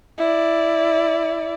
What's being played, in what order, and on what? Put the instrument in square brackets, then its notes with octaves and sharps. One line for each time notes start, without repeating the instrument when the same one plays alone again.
[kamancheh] E4 D5